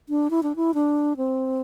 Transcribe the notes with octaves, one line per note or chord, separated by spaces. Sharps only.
D4
E4
D4
E4
D4
C4